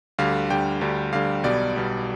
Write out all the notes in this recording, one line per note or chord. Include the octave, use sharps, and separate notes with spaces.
D2 D3 G3 F5
D2 D3 G3 G5
D2 D3 G3
D2 D3 G3 F5
B1 B2 G3 D5
B1 B2 G3